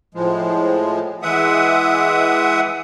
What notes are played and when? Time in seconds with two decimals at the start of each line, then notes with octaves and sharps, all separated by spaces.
0.14 A2 F3 G#3
1.22 E3 G#3 E5 F#5 D#6